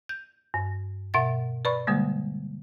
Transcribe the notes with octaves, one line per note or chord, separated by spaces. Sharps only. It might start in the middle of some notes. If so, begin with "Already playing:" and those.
G6
G2
B2 E5 F#5 A6
B4 D5 B5 C#6
D3 G3 G#3 A#3